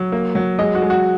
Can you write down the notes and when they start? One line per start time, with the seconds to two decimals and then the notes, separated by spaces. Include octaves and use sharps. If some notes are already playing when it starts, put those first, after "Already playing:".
Already playing: F#3
0.12 A#3
0.35 F#3
0.59 G#3 D#5
0.75 F#4
0.82 G#3
0.90 F#4